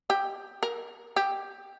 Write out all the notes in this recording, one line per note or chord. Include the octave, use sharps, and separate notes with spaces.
G4
A#4
G4